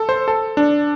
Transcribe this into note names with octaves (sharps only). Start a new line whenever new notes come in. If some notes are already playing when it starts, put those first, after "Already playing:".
Already playing: A4
C5
A4
D4